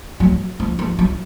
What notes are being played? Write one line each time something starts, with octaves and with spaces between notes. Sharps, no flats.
F#3
F3
F3
F#3